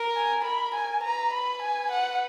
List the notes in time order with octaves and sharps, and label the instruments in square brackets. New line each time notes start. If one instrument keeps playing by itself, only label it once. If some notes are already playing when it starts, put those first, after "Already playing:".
Already playing: [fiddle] A#4
[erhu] G#5
[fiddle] A#4 [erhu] B5
[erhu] G#5
[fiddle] B4 [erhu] A#5
[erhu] B5
G#5
F#5